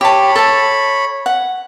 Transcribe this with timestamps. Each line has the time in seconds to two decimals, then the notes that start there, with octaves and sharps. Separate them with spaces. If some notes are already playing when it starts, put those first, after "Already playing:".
0.01 G4 C#5 A5 B5
0.36 A4 A5
1.26 F#5